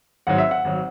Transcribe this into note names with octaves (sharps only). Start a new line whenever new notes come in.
G#1 G#2 F#3 F#5
E5
F#5
G#1 F#3